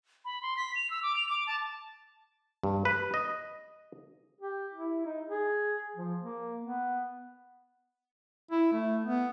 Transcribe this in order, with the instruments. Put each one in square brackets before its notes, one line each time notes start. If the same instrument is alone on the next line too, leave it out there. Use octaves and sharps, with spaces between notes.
[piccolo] B5
C6
B6
F7
E6
D6
F7
D6
A5
[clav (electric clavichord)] G2
B4
D#5
[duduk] G4
E4
D#4
G#4
F3
A#3
B3
E4
A3
B3